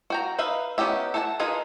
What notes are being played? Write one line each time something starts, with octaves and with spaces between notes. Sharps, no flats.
F#4 G5 A#5
D#4 B4 E5 F5
B3 C#4 D#4 G4 E5
A4 E5 F#5 G#5 A5
D#4 F4 G#4 A#4 B4